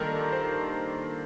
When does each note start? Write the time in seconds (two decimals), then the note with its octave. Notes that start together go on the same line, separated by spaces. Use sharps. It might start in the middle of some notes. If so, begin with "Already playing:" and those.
Already playing: D#3 G3 A#3 D4 F4 A4 A#4
0.32 C5